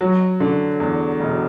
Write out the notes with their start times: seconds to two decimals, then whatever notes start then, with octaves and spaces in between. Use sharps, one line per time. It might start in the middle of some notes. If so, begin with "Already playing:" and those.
0.01 F#3
0.40 D3
0.80 E2
1.20 E1